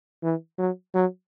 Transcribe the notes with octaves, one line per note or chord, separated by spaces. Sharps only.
E3
F#3
F#3